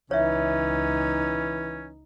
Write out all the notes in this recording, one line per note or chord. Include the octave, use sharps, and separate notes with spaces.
C#2 E3 C#4 D#4 C#5 E5